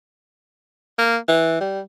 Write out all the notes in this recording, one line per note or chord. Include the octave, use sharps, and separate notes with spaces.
A#3
E3
G3